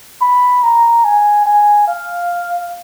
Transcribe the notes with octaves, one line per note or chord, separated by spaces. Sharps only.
B5
A#5
G#5
G#5
F5